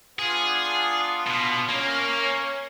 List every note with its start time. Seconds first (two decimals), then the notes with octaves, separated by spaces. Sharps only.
0.19 B3 D4 F4 G#4
1.27 B2
1.70 A#3 C#4